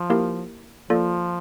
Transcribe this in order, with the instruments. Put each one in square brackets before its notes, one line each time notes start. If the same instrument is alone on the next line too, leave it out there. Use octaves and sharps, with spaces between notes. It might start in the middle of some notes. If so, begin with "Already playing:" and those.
Already playing: [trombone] F3
[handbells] A#3 E4 G4 A#4
[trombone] F3 [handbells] A#3 F4 A4 D5